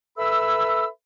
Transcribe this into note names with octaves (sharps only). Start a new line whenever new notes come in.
A4 B4 E5 B5 E6